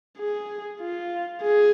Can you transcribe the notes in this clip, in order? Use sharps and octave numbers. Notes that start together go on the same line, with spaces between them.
G#4
F4
G#4